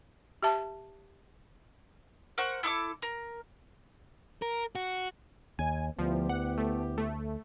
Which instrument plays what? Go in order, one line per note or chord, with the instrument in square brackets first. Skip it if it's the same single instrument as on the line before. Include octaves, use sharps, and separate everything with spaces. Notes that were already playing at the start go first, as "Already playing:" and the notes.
[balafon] G4 E5 A5
[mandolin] A#4 C5 F#5 C#6
E4 A4 C#6 D6
A#4
[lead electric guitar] A#4
F#4
[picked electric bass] D#2 [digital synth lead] G#5
[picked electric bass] D2 [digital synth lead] F3 [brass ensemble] B3 E4 G4
[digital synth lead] F#5
A3
A3